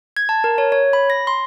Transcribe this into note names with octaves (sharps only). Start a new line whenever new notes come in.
G#6
A5
A#4
C#5
C#5
B5
A#6
C6